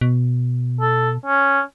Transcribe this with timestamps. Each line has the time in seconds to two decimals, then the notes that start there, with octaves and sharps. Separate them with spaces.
0.01 B2
0.81 A4
1.26 C#4